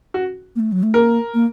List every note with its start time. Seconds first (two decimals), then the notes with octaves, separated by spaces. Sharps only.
0.14 F#4
0.56 A#3
0.60 A3
0.72 F#3
0.83 A3
0.94 A#3 A#4
1.34 A#3